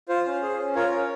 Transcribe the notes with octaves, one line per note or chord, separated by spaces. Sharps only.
F4 C5
C#4
G#4
C#4
F4 A#4 C#5
C#4